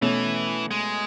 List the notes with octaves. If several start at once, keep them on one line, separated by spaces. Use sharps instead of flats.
B2 E3 A3 C#4
G#3